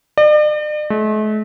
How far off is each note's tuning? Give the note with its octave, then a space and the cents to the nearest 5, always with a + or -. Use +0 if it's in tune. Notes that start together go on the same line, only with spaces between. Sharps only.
D5 +45
A3 -45